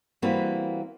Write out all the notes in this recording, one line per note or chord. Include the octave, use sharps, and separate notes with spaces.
E3 G3 A#3 C4 F#4 B4